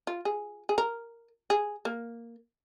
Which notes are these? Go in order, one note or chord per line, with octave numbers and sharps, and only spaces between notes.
F4
G#4
G#4
A#4
G#4
A#3